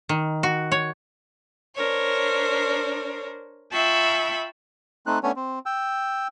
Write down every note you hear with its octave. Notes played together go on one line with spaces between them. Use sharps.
D#3
F#4
C#5
D4 A#4 C5 C#5
F4 E5 G5 A5 B5 C#6
A3 C4 D#4 F#6
A3 B3 C#4 D4 C#5 G#5
C4
G5 E6